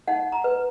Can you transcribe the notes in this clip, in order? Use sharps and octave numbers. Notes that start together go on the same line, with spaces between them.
D#4 F#5
A#5
B4